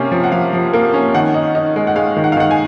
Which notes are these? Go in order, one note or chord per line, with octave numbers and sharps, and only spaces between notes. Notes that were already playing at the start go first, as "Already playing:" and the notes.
Already playing: C3 A#3 C#4 F5
F3
F#5
F3 F5
F3
A#3
C#4
D#3 F#5
D#4
D#4
G#3
F#5
G#3 F5
D#3
F#5
F5
D#3 F#5
G#5